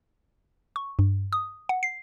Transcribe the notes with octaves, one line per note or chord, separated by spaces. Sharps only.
C#6
G2
D#6
F#5
C7